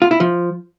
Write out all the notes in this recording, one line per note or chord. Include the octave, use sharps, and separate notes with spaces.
F4
E4
F3